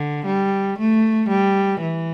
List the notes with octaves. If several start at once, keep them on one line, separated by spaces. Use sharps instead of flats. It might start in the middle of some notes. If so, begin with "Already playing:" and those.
Already playing: D3
G3
A3
G3
E3